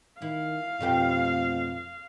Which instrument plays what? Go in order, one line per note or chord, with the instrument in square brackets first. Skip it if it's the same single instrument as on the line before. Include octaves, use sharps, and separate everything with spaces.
[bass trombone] D#3 [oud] E4 [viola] F5
[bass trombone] F2 [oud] B2 A3 G4